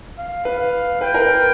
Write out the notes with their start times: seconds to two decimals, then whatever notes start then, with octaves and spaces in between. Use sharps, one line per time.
0.18 F5
0.45 B4
0.59 F5
1.01 B4 G5
1.14 A#4
1.22 B4